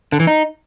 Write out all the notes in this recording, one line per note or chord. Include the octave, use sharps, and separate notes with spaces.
D3
E3
D#4